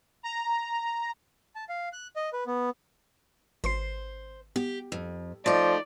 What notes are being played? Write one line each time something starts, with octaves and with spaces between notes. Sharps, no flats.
A#5
A5
F5
F#6
D#5
B4
B3
G#1 C5 C6 C7
B3 G4
F2
F3 A3 D#4 D5 A6